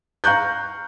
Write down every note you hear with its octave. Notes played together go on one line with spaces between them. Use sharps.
F5 A#5 C#6 F#6 G6